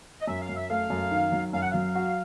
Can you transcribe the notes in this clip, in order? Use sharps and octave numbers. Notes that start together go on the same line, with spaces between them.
D#5
F#2 E5
F5
F#2
E5
A3 F5
F#2
D#3
F#3
F#2 F5
F#5
F#3 F5
F#4